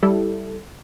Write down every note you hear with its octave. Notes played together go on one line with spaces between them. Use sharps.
G3 E4 A4